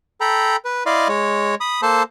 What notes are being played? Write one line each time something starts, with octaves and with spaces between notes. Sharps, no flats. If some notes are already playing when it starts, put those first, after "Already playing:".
A4 G5 A#5 B5
B4
E4 D5 D#5 F5 C6
G#3 C#5
B5 D#6
A#3 A4 C5 A5 C6